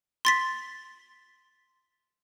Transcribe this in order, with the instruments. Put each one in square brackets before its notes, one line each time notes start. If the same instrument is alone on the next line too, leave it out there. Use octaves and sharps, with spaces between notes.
[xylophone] C6 A6 B6